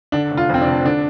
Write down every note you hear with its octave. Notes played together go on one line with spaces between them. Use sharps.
D3 D4
F1
F4
F2 C4
D4
F1
D3 D4